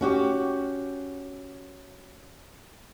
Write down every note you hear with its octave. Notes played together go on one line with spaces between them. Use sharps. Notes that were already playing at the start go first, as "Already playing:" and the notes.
C#4 F#4 G4